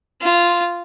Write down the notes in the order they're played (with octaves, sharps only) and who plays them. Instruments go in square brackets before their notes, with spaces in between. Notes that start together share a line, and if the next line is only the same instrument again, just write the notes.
[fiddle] F4